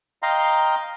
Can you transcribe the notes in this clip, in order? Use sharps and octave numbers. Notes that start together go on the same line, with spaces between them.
D#5 F5 G5 A#5 C6